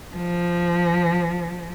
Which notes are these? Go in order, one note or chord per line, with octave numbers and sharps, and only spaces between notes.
F3